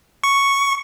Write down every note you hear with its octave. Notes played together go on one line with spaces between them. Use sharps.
C#6